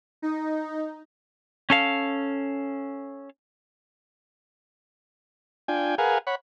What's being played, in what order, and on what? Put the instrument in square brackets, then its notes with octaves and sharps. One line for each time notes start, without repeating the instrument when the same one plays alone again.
[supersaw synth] D#4
[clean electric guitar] C#4 A4 F5
[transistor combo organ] D4 F4 G5 G#5
G#4 A#4 B4 F5 F#5 G#5
C#5 F#5 B5